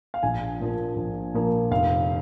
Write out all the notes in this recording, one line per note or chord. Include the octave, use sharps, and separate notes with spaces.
F5
A#1 G#5
A#2 F3 A#3
A#1
A#2 F3 A#3
F1 F5